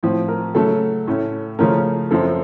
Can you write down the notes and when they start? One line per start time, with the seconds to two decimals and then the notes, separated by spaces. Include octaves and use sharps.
0.03 A2 F3 C4
0.28 A#4
0.55 C#3 F#3 A3 C#4 A4
1.07 A2 A3 C#4
1.59 C#3 F3 A3 C#4 A#4
2.11 F#2 F3 C4 A4